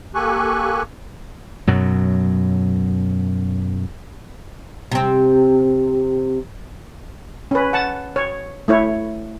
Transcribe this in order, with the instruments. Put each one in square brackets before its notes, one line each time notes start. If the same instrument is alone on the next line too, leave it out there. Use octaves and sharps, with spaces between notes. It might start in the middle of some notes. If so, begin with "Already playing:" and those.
[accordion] A#3 G4 A4 G#5 C#6 F#6
[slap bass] F#2 B2 F#3
[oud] C3 C4
[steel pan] C#4 B4
F#5 A5
C#5
A3 E4 C#5